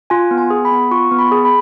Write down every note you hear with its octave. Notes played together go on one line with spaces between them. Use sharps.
F4 G#5
B3
G#5
G#4
B5
B3
F4 C#6
B3
B5
G#4
B5